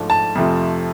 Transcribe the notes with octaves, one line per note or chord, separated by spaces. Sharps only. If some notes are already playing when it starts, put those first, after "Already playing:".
Already playing: G#2 F3 A3 D4
A5
F2 C3 F3 A3